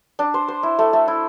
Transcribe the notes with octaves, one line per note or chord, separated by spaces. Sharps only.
D4
C5
C5
E4
A3
A3
E4